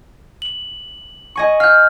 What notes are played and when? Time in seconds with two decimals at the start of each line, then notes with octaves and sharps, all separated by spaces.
0.42 F#7
1.36 D#5 G#5 C#6
1.60 F5 F6 G6